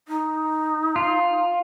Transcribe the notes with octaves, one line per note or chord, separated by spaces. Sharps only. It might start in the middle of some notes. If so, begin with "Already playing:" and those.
D#4
F4